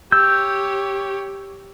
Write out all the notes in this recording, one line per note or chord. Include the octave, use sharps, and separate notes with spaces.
G4 C#5 E6 G6